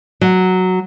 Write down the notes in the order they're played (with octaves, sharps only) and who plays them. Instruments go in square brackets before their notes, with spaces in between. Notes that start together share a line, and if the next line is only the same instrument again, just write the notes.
[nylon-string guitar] F#3